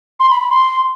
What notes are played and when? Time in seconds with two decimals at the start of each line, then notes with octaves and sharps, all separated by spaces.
0.20 C6
0.30 B5
0.40 B5
0.51 C6